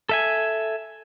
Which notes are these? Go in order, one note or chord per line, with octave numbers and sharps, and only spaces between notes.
A4 E5 G#5